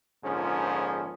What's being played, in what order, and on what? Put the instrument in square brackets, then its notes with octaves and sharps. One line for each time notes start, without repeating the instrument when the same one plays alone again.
[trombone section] A#1 G#2 D3 F3 C#4 G#4